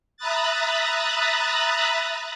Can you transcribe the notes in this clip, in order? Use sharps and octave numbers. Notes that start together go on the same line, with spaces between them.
E5 A#5 B5 D#6 F#6 A6